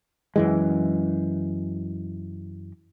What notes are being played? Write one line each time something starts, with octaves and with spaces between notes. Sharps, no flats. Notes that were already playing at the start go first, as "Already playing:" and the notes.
F#2 E3 G#3